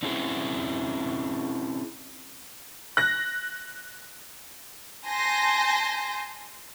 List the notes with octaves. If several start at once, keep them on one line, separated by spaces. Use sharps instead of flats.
C4 C#4 E4 G#4
F#6 A#6
G#5 A5 C6 G6 A#6